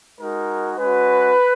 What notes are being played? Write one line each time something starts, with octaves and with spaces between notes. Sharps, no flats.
G#3 D#4 F#4 A#4
G#3 C#4 F#4 B4